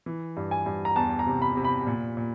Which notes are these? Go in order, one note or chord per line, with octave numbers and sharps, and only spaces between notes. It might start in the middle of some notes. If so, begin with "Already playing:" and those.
E3
G2
G#5
G2
A#5
E2 A5
A#5
C3
B5
C3
B5
A#2
A#2